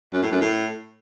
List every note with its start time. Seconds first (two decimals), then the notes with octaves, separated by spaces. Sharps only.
0.13 F#2
0.22 A2
0.32 F#2
0.41 A2